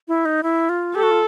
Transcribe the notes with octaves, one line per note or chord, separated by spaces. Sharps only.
E4
D#4
E4
F4
G4 A4
F#4
F4